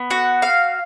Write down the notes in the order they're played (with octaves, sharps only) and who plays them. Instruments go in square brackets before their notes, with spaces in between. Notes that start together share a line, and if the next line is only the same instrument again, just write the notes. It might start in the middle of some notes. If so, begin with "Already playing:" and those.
Already playing: [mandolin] B3
F#4
F5